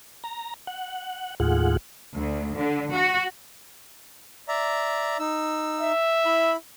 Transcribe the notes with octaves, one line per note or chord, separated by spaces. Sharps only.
A#5
F#5
D#2 A2 F4 G#4 F#5
D2
D3
F#4
D5 E5 A#5
D#4 E6
E5
E4 B5